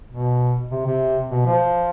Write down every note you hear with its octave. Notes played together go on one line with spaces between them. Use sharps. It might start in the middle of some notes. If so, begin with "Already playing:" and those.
B2
C3
C3
B2
F3